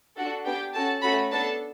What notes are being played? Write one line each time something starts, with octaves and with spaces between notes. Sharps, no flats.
D4 F#4 A4 F#5
B3 D4 G4 G5
C#4 F#4 A4 A5
A3 C#4 F#4 A4 B5
B3 D4 A4 A5